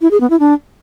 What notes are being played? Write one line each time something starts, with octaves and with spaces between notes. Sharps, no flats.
E4
G#4
B3
E4
D4